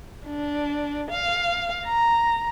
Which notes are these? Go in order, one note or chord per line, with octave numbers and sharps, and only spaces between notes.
D4
F5
A#5